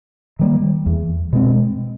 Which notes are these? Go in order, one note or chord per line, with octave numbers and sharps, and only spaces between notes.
D#3 G3 A#3
E2
B2 G#3 C4